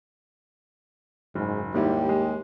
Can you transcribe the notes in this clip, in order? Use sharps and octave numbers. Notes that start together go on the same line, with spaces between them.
F#1 G#2
D#2 G#2 G3 E4 G4
G#3